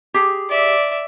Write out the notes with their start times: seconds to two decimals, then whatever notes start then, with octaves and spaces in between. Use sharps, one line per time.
0.14 G4 G#4
0.49 D5 E5